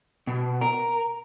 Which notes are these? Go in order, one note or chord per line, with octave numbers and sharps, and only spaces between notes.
B2
A#4